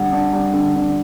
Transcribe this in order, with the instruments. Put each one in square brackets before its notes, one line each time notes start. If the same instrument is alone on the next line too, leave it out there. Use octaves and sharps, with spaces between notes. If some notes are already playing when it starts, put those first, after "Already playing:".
Already playing: [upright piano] D3 G3 [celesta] F#5
[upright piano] D4
G3
D3
D3